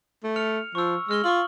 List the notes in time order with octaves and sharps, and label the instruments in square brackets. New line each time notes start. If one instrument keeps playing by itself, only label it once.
[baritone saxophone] A3
[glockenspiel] F6 C#7 F7
[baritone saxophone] F3 [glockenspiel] C#6 E6
[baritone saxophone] G#3 [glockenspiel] E6 F6 G7
[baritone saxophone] F4 [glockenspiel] C#6 F6 F#7